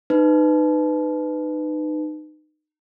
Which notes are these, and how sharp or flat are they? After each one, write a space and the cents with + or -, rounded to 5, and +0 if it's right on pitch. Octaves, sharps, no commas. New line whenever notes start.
D#4 -25 B4 +15